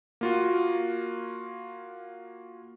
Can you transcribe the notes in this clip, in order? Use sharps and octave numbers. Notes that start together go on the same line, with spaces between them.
A#3 F4 F#4